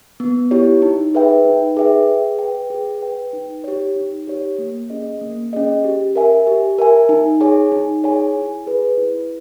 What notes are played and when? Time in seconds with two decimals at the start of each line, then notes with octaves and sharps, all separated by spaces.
0.20 B3
0.51 E4 G4 C#5
0.82 D#4
1.14 G#4 B4 E5 G5
1.45 D#4
1.77 G#4 B4 E5 G5
2.08 G#4
2.39 B4 G5
2.70 G#4
3.02 B4 G5
3.33 D#4
3.64 G4 C#5
3.96 D#4
4.28 G4 C#5
4.58 A#3
4.90 C#4 G#4 D#5
5.21 A#3
5.53 C#4 G#4 D#5
5.84 G4
6.15 A#4 E5 G#5
6.47 G4
6.78 A#4 E5 G#5
7.09 D#4
7.41 G#4 C#5 G#5
7.72 D#4
8.04 G#4 C#5 G#5
8.35 E4
8.67 G#4 B4
8.98 E4